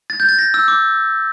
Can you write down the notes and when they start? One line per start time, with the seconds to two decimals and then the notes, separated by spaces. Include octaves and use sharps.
0.10 A6
0.20 G6
0.29 A6
0.39 A#6
0.54 E6
0.68 D6